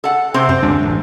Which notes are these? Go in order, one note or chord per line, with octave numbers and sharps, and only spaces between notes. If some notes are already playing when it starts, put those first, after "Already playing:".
A4 F#5
C3 C4 C5
F#2 C4
D2 G#3 D4
A1